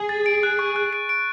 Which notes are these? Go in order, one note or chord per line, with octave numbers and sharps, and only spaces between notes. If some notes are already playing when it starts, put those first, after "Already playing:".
Already playing: G#4
A6
D7
F#6
C#6
F#6
D7
D7